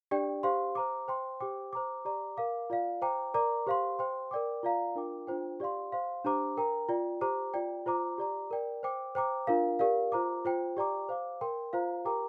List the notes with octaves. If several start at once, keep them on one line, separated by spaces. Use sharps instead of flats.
D4 G4 D5 G5
G4 C5 F5 C6
C5 A#5 D6
C5 G5 C6
G4 C5 G5 D6
C5 A#5 D6
G4 D5 A#5 D6
A#4 F5 D6
F4 D5 F5
C5 G5 A#5 D6
A#4 D5 A#5 D6
G4 C5 F5 C6
C5 G5 C6
A#4 D5 G5 D6
F4 D5 F5 A#5
D4 F4 A#4 G5 D6
D4 F4 C5 G5
G4 D5 F5 C6
C5 F5 C6
D4 G4 C5 A#5 D6
A#4 G5 A#5
F4 D5 G5
G4 C5 A#5 D6
F4 D5 G5
F4 C5 A#5 D6
G4 D5 A#5 D6
A#4 D5 G5
C5 G5 D6
C5 G5 A#5 D6
D4 F4 A#4 F5
G4 A#4 D5 F5
F4 C5 A#5 D6
F4 C5 G5
G4 D5 G5 A#5 D6
C5 F5 D6
A#4 G5 C6
F4 C5 F5 A#5
G4 A#4 G5 A#5 D6